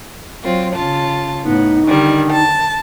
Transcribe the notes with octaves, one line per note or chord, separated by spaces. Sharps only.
F#3 C4 F4
C#3 F4 A5
A2 B3 D#4
D3 D#3 G3
A5